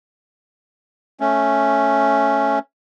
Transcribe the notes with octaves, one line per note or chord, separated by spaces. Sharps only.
A3 C#4